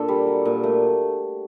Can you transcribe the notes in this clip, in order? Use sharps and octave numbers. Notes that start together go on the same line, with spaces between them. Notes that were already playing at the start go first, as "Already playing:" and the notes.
Already playing: A#2 D4 A4
G3
F#3
A#2
A3